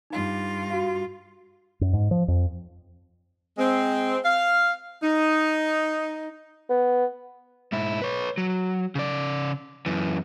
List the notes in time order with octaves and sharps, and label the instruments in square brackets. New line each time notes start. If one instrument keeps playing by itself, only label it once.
[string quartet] G2 F4 [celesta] D#4 F5
[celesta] F#4 F5
[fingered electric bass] F#2
G#2
F3
F2
[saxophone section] G#3 C4
F5
D#4
[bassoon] B3
[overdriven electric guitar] G#2 E4
B4 C#5
F#3
C#3 D5
F#2 E3